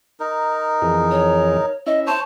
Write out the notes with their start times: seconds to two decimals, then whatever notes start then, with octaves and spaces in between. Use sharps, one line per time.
0.20 D#4 A#4
0.82 F2 E3 G#4
1.11 C#5
1.87 C#4 E4 D#5 E5
2.07 C5 C#5 A5